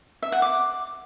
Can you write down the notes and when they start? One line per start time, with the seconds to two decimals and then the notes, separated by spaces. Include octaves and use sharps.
0.22 E5
0.32 F#5
0.42 D6